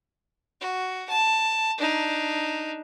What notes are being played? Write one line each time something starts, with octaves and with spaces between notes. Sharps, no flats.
F#4
A5
D4 D#4